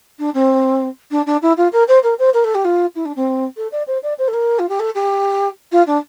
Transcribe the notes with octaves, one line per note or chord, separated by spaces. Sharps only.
D4
C4
D4
D4
E4
F4
A#4
C5
A#4
C5
A#4
A4
G4
F4
E4
D4
C4
A4
D5
C5
D5
C5
A4
A#4
F4
G4
A4
G4
F4
D4